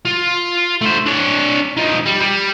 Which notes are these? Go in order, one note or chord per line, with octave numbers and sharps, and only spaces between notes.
F4
A3 C5
D4 C#5
F3 D#4
G3
G3